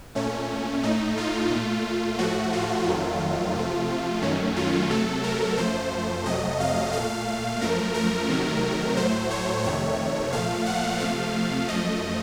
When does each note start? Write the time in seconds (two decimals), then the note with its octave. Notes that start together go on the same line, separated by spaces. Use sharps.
0.15 A#2 A3 C#4
0.83 A2 A3 D#4
1.17 F4
1.51 A#2 A3
2.18 A2 F3 A3 F#4
2.53 F4
2.87 F2 D#3 F#3 A3
3.55 C3 F3 A3
4.22 F#2 D#3 F#3 A3 C#4
4.56 F4
4.90 C3 F#3 A3 A4
5.23 A#4
5.58 F#2 F3 A3 C5
6.26 F2 C3 F#3 A3 D#5
6.60 F5
6.93 A#2 A3 F5
7.61 F#2 F3 A3 A#4
7.94 A#4
8.29 C3 D#3 F#3 A3
8.96 A2 F#3 A3 C5
9.30 C#5
9.64 F2 C3 D#3 A3 C#5
10.32 A#2 F3 A3 F5
10.66 F#5
11.00 C3 F3 A3 F5
11.68 F#2 F3 A3 D#5